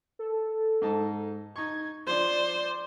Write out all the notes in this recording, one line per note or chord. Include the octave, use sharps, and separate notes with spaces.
A4
G#2 D#4 A5
D#4 C#6 G#6
F3 D4 C5 D5